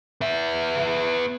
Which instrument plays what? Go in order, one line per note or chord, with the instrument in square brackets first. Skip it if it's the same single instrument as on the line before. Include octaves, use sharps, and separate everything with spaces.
[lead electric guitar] B3 E5